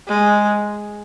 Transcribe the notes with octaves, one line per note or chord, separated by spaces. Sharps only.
G#3